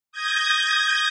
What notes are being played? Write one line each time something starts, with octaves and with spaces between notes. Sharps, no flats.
D#6 G6 G#6 A#6